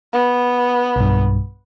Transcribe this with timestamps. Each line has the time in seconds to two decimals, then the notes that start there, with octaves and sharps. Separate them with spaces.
0.13 B3
0.96 B1 G2